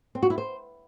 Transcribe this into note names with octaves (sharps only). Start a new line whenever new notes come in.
C4
F#4
E4
C5